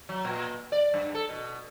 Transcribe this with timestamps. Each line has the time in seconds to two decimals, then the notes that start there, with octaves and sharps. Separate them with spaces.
0.09 F#3
0.25 A#2
0.72 D5
0.94 G2
1.14 A4
1.29 B2